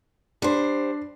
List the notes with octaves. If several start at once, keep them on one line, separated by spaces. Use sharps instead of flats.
G3 D4 C5